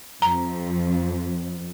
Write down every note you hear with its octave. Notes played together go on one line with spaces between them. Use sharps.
F2 A#5